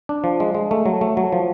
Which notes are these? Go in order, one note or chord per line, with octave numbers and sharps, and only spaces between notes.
D4
F3
G#3
G#3
A3
F#3
A3
F#3
F3